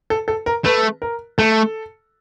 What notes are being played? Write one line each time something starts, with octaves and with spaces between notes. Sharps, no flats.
A4
A4
A#4
A3 B4
A#4
A3 A4